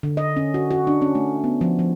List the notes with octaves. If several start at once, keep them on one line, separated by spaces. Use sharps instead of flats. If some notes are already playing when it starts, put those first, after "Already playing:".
D3
D#5
C#4
F#4
F#4
D4
C#4
A3
B3
F3
F3